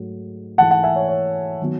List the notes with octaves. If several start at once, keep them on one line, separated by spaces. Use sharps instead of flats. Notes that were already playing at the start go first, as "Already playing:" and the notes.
Already playing: G#2 F#3 A3
G#2 E3 A3 F#5 A5
F#5 A5
E5 G#5
C#5
C#5
D#3 F#3 B3